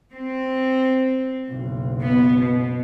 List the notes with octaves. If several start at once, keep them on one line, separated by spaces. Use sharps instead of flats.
C4
F#1 B1
B3
B2